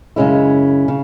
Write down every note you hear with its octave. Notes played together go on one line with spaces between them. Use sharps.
F#2 C#3 G#3 C#4 E4
C#3